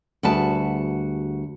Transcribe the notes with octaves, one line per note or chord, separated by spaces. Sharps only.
D2 G3 F#4 G#4 B4 A5